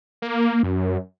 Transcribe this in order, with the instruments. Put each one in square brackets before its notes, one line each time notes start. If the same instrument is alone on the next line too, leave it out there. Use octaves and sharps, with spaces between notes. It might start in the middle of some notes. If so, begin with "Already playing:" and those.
[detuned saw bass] A#3
F#2